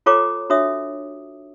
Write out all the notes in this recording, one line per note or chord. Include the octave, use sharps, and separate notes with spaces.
F4 A4 C#5 G5 A#5 D6
D4 F#4 C#5 E5 D#6